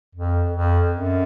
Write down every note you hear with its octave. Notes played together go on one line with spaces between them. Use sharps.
F2
F2
F#2